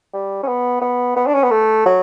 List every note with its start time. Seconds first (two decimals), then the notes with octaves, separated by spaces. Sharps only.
0.14 G3
0.43 C#4
0.48 B3
0.82 B3
1.16 B3
1.27 D4
1.35 C#4
1.43 B3
1.51 A3
1.86 F#3